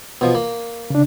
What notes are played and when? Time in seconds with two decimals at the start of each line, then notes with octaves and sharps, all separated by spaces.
0.21 B2 F3
0.35 A#3
0.90 C#3 D4